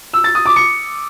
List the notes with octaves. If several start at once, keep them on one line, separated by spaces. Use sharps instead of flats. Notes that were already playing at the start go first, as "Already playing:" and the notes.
E6
A6
D#6
D6
C#7